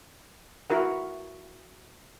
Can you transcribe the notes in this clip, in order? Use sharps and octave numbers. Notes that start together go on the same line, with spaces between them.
E4 F#4 A#4 F#5